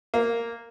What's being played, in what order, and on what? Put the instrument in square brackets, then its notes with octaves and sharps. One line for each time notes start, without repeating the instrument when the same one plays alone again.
[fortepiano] A#3